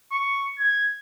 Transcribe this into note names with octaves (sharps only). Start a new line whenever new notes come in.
C#6
G#6